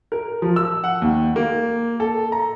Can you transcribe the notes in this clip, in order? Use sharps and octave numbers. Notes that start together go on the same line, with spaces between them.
A#4
F3
E6
F#5
D#2
A#3
A4
A#5